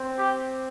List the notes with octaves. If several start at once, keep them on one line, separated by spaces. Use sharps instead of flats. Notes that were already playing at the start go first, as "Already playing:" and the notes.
Already playing: C4
G4